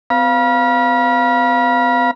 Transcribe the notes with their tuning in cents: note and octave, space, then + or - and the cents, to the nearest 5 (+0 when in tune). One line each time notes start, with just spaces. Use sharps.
C4 -45 F5 +0 B5 -40